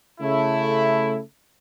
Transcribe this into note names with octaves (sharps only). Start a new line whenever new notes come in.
C#3 A3 E4